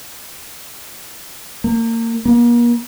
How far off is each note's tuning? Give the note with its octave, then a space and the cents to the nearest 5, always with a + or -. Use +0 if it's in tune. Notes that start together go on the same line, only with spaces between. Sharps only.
A#3 -30
A#3 +35